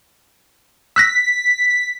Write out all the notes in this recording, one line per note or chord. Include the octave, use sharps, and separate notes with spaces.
E6 F#6 A#6 B6